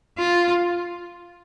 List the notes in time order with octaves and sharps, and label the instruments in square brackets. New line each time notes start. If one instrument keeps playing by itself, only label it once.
[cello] F4